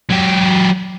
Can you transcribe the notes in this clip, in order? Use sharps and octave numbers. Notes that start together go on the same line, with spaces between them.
F#3 G4